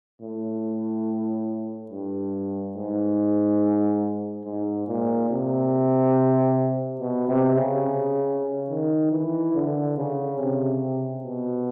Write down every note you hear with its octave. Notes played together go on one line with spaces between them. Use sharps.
A2
G2
G#2
G#2
A#2
C3
B2
C3
C#3
D#3
E3
D3
C#3
C3
B2